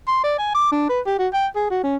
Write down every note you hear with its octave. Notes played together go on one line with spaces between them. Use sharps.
C6
D5
G#5
D6
D4
B4
G4
F#4
G5
G#4
F#4
C#4